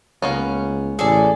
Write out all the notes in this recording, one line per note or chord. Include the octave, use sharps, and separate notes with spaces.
C#2 A#3 B3 C#4
A1 G#4 A4 D5